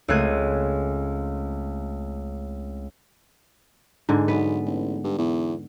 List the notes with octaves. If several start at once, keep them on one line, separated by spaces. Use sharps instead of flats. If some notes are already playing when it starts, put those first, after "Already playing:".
C#2 A3 C4 F#6 G#6 D#7
G#2 D3 G#3
B1 B3
A1
G2
E2